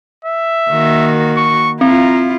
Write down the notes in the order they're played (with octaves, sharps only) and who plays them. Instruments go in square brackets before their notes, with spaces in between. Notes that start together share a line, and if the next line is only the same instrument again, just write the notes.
[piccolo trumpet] E5
[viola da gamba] D#3 A#3 F#4
[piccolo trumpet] C#6
[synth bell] C4 [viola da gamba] E4 F4 [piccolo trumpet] A#5